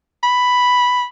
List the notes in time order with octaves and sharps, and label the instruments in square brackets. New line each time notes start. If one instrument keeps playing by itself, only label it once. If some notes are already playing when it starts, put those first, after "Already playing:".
[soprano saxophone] B5